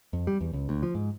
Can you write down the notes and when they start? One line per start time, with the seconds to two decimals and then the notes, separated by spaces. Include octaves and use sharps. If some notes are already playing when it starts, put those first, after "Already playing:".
0.13 F2
0.27 G3
0.41 E2
0.53 C#2
0.69 D2
0.83 F3
0.95 G#2